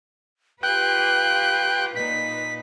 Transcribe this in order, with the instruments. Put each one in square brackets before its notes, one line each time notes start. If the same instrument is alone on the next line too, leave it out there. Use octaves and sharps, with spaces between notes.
[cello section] F4 G4 B4 [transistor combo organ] G5 [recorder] F#6
[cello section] A#2 D#4 B4 [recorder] B6